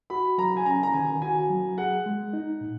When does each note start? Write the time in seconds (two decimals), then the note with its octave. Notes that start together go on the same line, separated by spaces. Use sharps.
0.10 F#4 B5
0.38 F#3 A#5
0.57 G#5
0.66 C#4 A#5
0.83 A#5
0.94 D#3 G#5
1.22 F#4 G#5
1.50 F#3
1.78 G#4 F#5
2.06 G#3
2.33 D#4
2.61 A#2